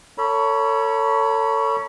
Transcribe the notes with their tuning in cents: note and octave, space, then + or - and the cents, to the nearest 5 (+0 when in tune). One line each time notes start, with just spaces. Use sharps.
A4 +30 C#5 +15 B5 -25